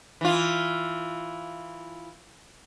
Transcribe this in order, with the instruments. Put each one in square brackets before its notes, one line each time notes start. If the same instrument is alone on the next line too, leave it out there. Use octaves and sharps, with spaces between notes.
[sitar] E3 F4